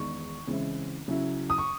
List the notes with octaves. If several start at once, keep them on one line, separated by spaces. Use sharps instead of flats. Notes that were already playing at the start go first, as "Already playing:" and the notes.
Already playing: E2 D#3 G#3 D#4 C#6
C#3 E3 G#3 C4 E4
C#3 F#3 C#4 E4
D#6
C#6